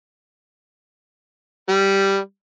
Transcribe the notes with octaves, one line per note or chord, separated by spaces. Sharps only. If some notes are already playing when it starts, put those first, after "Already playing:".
G3